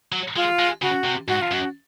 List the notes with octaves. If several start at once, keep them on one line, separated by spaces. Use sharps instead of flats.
F#3
G#3 F4
G#3
C#3 F#4
C3
G#2 F#4
F4
F#2 F#4